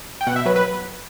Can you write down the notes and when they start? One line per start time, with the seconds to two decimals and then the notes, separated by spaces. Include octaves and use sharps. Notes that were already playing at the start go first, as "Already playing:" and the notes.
0.21 G5
0.27 B2 F#5
0.36 E5
0.45 F#3 B4
0.56 B4